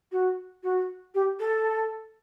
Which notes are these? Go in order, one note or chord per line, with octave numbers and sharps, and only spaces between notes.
F#4
F#4
G4
A4